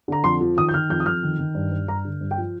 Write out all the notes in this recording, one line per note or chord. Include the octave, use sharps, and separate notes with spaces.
D3 A#5
F2 C6
F3
D#3 D#6
G6
D#3 F6
F2 G6
D#6
F2 F6
D#3
D#3
G2
G2
G2 A#5
D3
G2
G5
F3